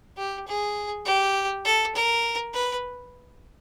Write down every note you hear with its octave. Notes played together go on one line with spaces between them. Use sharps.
G4
G#4
G4
A4
A#4
B4